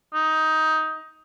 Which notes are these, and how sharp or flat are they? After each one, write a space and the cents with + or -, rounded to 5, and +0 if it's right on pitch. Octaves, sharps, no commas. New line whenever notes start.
D#4 +15